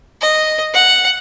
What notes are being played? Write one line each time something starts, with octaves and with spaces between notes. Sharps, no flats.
D#5
F#5